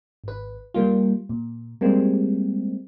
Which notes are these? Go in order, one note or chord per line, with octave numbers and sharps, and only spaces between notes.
G#1 B4
G3 A#3 F4
A#2
G3 G#3 A#3 C4